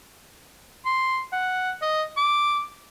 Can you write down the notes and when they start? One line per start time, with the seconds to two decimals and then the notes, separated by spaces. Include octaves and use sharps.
0.85 C6
1.33 F#5
1.82 D#5
2.17 D6